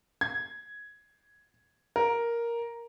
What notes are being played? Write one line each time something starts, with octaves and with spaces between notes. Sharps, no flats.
G#6
A#4